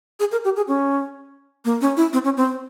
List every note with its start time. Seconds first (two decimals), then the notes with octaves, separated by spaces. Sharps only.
0.20 G#4
0.32 A#4
0.44 G4
0.56 G#4
0.68 C#4
1.65 A#3
1.81 C#4
1.97 E4
2.13 C4
2.24 C#4
2.37 C4